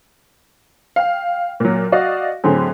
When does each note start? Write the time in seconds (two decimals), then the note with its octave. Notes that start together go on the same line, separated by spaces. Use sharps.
0.96 F5 G5
1.60 A#2 F#3
1.92 F#4 D5 D#5 F5
2.44 A2 D3 F#3 C4 G#4